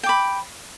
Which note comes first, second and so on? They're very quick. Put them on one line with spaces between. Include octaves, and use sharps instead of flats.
G5 D6 B5